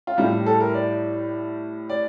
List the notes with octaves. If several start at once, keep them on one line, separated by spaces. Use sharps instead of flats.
F4
A2 G3 G4
A4
A#4
D5
D5